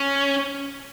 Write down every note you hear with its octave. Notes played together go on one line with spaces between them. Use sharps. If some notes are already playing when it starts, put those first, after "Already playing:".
Already playing: C#4